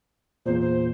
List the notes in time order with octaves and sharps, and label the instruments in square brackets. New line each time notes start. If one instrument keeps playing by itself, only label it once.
[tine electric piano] E2 A#2 [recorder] C5
[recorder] C5